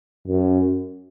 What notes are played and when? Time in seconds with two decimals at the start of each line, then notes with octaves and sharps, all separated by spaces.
0.27 F#2